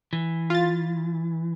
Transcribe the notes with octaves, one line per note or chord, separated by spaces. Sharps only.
E3
F4 A6